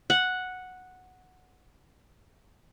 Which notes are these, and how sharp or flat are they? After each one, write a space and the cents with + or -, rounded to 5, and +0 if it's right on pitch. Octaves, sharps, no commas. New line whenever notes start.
F#5 -5